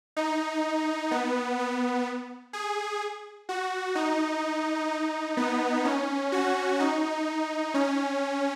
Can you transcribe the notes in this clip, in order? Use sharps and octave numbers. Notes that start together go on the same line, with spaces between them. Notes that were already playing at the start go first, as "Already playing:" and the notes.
D#4
B3
B3
G#4
F#4
D#4
D#4
B3
C#4
F#4
D#4
C#4